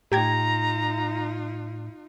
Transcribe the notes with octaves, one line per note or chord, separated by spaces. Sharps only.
A2 D#4 F4 G4 G5 A#5 G#6